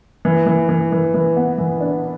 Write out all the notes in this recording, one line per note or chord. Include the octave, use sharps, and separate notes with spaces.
E3
E3
E3
E3
E3
B3
E3
D4